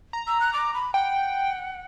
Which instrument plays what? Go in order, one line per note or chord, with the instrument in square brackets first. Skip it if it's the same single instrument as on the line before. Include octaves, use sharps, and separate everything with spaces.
[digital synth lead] A#5
[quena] E6
F#6
D6
B5
[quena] F#5 [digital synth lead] G5